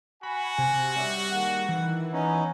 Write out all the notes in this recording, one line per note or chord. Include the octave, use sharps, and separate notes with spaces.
F#4 G#5 B5
C3
G2 G3 C#5 E5
D#3 A#3 G#4 F#5
D#3 E3
A#1 B3 C#4 D#4 G#5 A#5